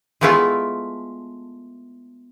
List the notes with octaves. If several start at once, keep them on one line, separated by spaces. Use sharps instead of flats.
G#3 A3 B3 E4 F4 A4